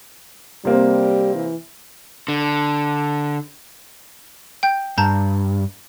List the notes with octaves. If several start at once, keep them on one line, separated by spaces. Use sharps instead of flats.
C3 G3 A#3 C4
E3
D3
G5 G6
G2 A5 A#5 G6